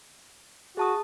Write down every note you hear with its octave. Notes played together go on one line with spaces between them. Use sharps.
F#4 G#4 A5 D#6